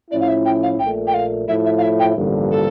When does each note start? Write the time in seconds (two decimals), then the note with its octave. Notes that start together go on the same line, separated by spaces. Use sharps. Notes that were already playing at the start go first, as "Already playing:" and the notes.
0.11 A2 F3 C#4 E4 D5
0.21 F5
0.28 E5
0.45 G5
0.63 F5
0.79 A#1 A#2 A3 G5
1.07 G5
1.14 F5
1.48 A2 F3 A3 E4 E5
1.66 E5
1.78 F5
1.83 E5
2.00 G5
2.17 A1 G2 D3 F3 A#3
2.51 A4